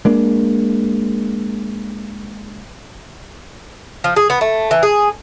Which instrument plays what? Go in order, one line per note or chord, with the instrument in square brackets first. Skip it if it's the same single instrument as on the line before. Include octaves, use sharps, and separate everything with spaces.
[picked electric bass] G#3 A#3 D4
[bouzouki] F3
G#4
B3
A3
E3
G#4